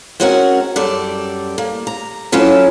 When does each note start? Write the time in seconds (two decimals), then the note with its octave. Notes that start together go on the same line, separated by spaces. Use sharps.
0.20 G#3 C4 C#4 F#4 A#4 F#5
0.76 F#2 G3 A4 D5
1.58 A#3
1.87 A#5
2.32 F#3 C#4 E4 F4 A4